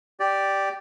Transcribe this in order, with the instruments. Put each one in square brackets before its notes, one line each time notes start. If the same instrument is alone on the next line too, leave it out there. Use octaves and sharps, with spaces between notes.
[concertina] G4 D5